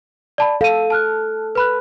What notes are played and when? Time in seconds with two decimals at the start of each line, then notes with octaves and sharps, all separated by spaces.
0.38 D5 A5 B5
0.61 A4 F5 D#7
0.90 A5 F6 F#6
1.55 B4 B5 F#6